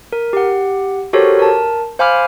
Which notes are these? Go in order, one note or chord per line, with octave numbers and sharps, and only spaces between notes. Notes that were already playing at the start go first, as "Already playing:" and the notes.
A#4
G4 F#5
F#4 G4 A4 A#4 C5 C#5
A#4 A5
C5 F5 G#5 B5 D6 F6